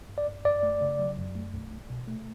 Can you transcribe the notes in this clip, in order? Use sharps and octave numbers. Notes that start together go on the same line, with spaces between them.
G2
D5
G2
F#2 D5
A3
C#3
F#3
F#2
A3
B1
B1
B2
A3